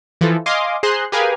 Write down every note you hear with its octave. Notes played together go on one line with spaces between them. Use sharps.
E3 F3 A4
D#5 F5 G#5 C6 D6 D#6
G#4 C5 A#5 C6 F#6
G4 G#4 A#4 B4 F5 G#5